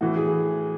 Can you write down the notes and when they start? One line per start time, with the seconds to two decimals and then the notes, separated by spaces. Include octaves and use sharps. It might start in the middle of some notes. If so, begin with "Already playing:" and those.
0.01 A2 E3 F#4
0.16 G#4